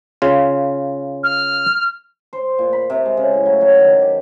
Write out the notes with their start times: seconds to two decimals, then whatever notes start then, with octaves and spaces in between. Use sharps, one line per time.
0.22 C#3 F4
1.24 F6
2.33 C5
2.59 A#2
2.73 B5
2.90 C3
3.06 G#3
3.17 C#3
3.34 A2
3.46 F#3
3.61 F#3
3.80 D#3
4.01 G4